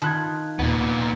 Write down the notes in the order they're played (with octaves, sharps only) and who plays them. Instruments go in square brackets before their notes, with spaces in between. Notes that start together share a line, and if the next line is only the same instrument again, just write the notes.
[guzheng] D#3 F4 B5 [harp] A5 F#6 G#6
[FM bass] D#2 [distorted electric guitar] A#2 B3